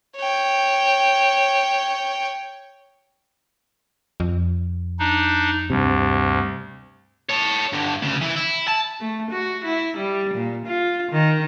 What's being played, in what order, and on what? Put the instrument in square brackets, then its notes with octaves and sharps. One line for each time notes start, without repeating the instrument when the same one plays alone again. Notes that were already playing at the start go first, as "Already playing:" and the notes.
[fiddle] C#5 G5
[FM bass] F2
[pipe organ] D4 D#4
[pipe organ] D2 [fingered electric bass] G2 C3
[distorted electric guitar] A4 C#5
G2 D3
D2 C#3
E3 E4
E4
A5
[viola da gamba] A3
F#4
E4
G3
A#2
F4
D#3